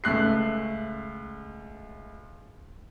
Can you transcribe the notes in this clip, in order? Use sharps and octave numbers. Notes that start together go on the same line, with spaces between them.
C#2 A3 F#6 C7